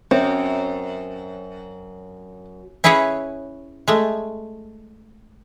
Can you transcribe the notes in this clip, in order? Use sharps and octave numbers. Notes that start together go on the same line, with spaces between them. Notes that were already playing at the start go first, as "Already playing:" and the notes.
F#2 C4
C#4 E4 G#4 B4 C#5
G#3 A3